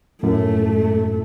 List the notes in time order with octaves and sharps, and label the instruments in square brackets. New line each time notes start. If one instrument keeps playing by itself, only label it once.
[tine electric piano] F#2 A2 [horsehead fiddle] A3